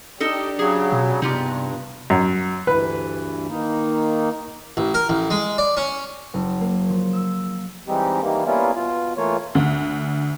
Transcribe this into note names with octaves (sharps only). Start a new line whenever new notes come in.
D4 D#4 G4 A4
C#3 F#3 G#4
B2
G2 C3 B3 D#4 F4 G4
F#2
D2 G2 E3 B4
D#3 A#3 D#4
A1
A#4
A1
G#3
D5
C#4
F#1
A#3
F3
E6
E3 G3 G#3 C4 D#4 G4
D#3 E3 G3 A#3
G3 A#3 B3 C#4 E4 F4
B2 F4
E3 A3 A#3 F4 C#5
D2